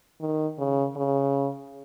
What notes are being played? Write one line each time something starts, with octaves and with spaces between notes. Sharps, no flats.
D#3
C#3
C#3